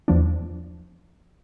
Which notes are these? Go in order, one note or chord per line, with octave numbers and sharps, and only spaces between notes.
E2 F3 D4